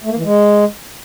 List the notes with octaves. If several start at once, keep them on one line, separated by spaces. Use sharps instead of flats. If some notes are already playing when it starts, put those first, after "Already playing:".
A3
A#3
E3
G#3